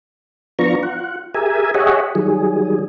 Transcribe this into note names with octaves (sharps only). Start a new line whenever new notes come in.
F3 B3 D4 F4 A#5 C#6
F4 F#5
G4 G#4 A#4 E5 G#5
G4 G#4 C#5 D#5 E5 F#5
D#3 F#3 G3 G#4